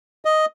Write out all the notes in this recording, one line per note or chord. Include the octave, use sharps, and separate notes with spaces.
D#5